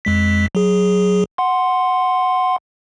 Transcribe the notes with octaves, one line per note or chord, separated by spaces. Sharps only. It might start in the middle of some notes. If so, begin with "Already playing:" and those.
F2 G#3 B6
F#3 G#4
F#5 C6